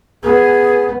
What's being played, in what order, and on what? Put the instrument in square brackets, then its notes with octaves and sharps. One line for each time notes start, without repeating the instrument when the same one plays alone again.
[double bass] B3 [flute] G#4